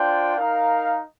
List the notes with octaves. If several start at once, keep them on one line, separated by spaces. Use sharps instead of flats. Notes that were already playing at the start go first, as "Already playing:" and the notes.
Already playing: D4 F4 C5 G5
D#4 A#4 F5